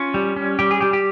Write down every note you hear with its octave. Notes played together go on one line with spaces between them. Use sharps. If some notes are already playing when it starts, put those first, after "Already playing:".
Already playing: C#4 F4
G3
C#4
G3 G4
G#4
G3 G4
G4